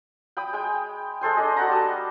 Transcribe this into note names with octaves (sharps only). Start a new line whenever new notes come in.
G5 B5 D#6
G#3 G5
G#3 A4 C5 G#5
D4 G#4 D#5
F#4 A4 F#5 A#5
G3 G#5 A5 D#6